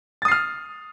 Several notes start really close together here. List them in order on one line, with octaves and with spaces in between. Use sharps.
A6 D#6 C7 F6